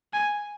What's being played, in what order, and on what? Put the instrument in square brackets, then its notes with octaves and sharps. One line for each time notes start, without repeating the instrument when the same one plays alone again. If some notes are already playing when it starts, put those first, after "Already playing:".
[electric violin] G#5